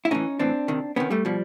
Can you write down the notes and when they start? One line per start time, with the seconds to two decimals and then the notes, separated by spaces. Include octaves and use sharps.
0.05 E4
0.11 A2 E3 C#4 D#4
0.39 A2 E3 C4 D4
0.68 C3 D#3
0.96 C3 D#3 B3 C#4
1.10 G3 A3
1.25 B2 F3 G3